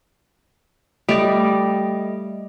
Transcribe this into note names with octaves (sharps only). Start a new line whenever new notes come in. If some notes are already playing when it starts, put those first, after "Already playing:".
G3 A3 D5 D#5